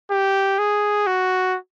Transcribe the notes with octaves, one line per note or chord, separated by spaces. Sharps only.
G4
G#4
F#4